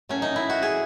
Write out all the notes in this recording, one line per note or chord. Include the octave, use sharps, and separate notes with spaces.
A2 F#3 A3 C#4
D#4
E4
F#4
G#4